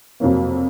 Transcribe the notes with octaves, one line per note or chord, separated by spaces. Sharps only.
F2 C3 F#3 A#3